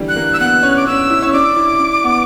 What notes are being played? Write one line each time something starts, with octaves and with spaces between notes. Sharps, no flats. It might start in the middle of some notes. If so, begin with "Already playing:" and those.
Already playing: D3 E3 G3
F#6
A#3
E6
B3 F#6
C#4
D6
C#4 E6
E4
C#4
D4 D6
E4
D4
B3